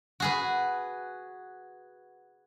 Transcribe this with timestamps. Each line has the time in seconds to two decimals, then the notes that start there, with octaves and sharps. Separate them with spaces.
0.20 F#4 G#4 B4